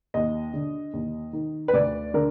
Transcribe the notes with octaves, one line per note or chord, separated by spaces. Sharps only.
D#2 D#5
D3
D#2
D#3
B4
D2 D5
D3 A#4